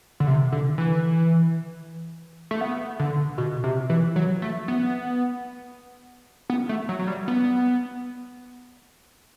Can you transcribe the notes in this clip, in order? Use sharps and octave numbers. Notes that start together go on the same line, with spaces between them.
D3
C3
D3
E3
A3
B3
D3
B2
C3
E3
F#3
A3
B3
B3
A3
F#3
F#3
G3
B3